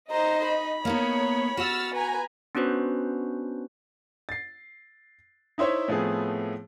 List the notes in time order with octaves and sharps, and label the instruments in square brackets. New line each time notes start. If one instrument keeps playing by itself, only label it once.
[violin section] D#4 D#5 [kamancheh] C5 A#5
[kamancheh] B5
[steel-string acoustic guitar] A#3 B3 D#4 [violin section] C#5
[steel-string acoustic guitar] F#4 F#5 [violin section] E6 F6 A6
[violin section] B4 G#5 A#5
[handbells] B3 C#4 D4 F#4 B4 C5
[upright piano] A6 C7
D#4 E4 C5 C#5 E5
A2 F3 A3 B3 C4 G#4